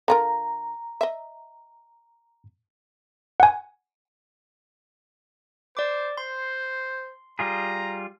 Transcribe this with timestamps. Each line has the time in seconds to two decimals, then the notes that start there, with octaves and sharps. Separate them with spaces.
0.08 D3 F4 A#4 A#5
1.01 D#5 E5
3.40 F#5 G#5
5.77 C5 D5 D6
6.17 C5 C6
7.39 G3 F4 G#4 A#5